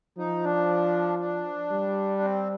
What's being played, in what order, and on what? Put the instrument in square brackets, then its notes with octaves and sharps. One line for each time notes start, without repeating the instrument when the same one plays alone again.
[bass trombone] F3 [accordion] D#4
[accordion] D4
D4
[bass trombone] G3
[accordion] C4